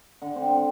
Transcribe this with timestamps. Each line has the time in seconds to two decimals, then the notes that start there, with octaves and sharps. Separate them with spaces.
0.22 D3
0.36 C4
0.50 C4